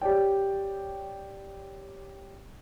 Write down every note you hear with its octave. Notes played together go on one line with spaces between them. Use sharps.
G4 C#5 D5 G5